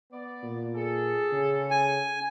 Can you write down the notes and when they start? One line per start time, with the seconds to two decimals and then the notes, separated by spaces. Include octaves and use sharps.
0.12 B3 D5
0.43 A#2
0.75 G#4 A4
1.32 C#3
1.71 G#5